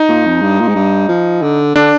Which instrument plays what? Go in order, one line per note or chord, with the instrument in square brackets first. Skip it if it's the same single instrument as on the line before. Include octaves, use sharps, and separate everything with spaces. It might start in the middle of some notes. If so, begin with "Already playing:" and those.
Already playing: [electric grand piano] D#4
[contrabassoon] A#2
F2
G2
A#2
G#2
G2
F3
D3
[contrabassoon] D3 [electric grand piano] D4